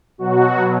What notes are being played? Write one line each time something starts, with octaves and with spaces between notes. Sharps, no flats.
B2 F#3 F#4